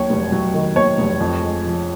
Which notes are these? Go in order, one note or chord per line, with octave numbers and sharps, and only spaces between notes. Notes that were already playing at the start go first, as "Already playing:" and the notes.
Already playing: D#2 D#3 F#3 C#5
F1
F#3
D#3
D#2 C#5
F1
F2
G#3
F3